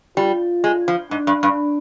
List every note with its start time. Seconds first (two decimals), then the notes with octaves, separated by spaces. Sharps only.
0.17 G3 F4
0.64 G#3
0.88 F3
1.11 G#2 D4
1.27 G2
1.43 G2